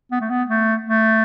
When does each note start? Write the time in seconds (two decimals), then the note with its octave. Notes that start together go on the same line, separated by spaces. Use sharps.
0.12 B3
0.21 A3
0.30 B3
0.48 A3
0.87 A3